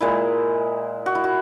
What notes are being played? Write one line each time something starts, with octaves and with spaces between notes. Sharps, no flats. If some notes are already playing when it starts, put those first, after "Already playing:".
A#2 G#3 E4
F#4
E4
F#4